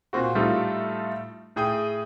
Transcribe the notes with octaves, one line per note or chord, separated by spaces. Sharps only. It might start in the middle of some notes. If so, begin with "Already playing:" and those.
A#2 C4 F#4
A2 G3 A3 D#4 F4
A2 G#4 G5 D#6